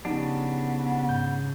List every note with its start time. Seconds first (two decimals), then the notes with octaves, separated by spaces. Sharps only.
0.05 C#3 F3 B3 D4 D#4 G4
1.09 G#2 G6